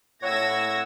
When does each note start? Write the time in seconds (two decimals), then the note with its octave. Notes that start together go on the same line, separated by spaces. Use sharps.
0.22 A2 C#5 F#5 E6 G#6 A#6